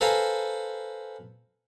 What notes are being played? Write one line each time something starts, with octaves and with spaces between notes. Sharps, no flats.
A4 B4 C5 F5 G#5 A#5